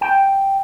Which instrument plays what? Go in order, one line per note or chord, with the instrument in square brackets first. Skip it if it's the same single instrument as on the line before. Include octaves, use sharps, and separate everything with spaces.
[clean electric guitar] G5